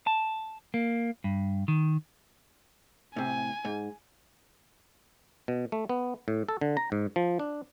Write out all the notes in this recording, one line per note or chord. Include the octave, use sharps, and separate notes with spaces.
A5
A#3
G2
D#3
A2 C3 G#5
G#2
B2
A3
B3
A2
A4
D3
A#5
G#2
F3
D4